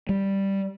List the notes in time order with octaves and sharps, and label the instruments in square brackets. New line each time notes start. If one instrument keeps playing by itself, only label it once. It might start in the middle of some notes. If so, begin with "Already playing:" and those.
[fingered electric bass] G3